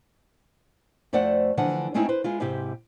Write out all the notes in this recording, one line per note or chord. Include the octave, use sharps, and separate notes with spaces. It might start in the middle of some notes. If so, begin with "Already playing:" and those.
F2 A3 C5 D5 F#5
D3 E3 F3 F#5
G#3 A3 C4 C#4 D#4 E4
B4 C5
G#3 E4 F4
G#2 C3 E4 G4